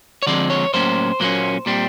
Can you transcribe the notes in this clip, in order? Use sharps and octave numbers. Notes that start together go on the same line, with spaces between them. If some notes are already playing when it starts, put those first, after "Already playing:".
C#5
D3 F3 G#3 C4 D5
C#5
A2 F#3 A#3 C#4 C5
A#2 F#3 A#3 C#4
A#2 G3 C4